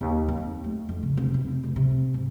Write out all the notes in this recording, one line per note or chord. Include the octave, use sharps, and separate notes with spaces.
D#2
D#4
F2
A3
F2
C#3
F1
C3
C4
F1
C3
G#2